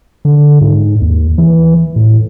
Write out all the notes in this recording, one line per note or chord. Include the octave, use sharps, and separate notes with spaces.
D3
G#2
D#2
E3
A2